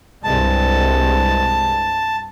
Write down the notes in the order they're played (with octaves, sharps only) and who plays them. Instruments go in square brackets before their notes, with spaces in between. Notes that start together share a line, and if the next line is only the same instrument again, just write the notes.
[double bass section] C2 G2 G#3 [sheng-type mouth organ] A5